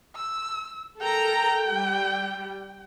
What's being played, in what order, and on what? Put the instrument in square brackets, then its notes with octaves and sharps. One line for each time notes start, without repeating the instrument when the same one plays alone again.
[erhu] E6
[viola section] A4 A#4 A#5 [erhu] G5
[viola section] G3